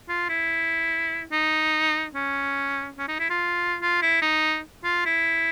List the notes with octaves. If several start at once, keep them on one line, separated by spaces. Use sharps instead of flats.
F4
E4
D#4
C#4
C#4
D#4
E4
F4
F4
E4
D#4
F4
E4